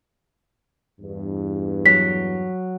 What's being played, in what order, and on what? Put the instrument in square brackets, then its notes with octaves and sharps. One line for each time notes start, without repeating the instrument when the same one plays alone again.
[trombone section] E2 G2
[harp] F#3 [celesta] B6